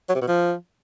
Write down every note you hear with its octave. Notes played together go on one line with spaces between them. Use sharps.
F#3
C3
B2
F3